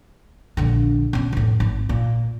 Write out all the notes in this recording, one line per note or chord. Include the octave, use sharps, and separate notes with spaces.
A#1 D3
B2 C#4
F1 A2
G#1
A#2